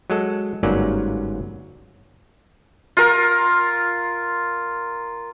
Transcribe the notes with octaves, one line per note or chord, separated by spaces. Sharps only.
F#3 G#3 A4
G1 G#2 F#3 A#3 C#4 D5
F4 A#4